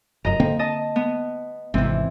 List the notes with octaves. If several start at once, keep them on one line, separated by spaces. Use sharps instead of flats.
F1 F#2 D#5 A#5
D3 A#3 C4
D#5 A5
B3
G#1 C3 E3 C4